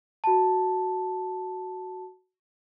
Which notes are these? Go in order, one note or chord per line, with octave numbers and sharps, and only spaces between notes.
F#4 A5